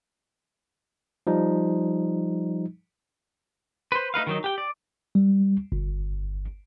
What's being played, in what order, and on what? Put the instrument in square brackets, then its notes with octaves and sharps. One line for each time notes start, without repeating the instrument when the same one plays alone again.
[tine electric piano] F3 G3 D#4
[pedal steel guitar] B4 C5
A3 D#4 B4 F5
D#3 F#3 D#4
G4 G5
D5
[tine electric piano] G3
G1